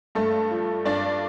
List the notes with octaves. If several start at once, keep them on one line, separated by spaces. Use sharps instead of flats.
G2 A3 A4
F3
G2 D4 D5